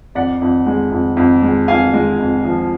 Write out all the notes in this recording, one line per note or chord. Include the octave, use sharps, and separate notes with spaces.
F2 D5 F#5
F2
G#3
F2
F2
G#3
F2 F5 G#5
G#3
F2
F3